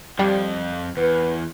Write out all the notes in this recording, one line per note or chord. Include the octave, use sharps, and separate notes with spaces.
F2 F3 G3
E2 B4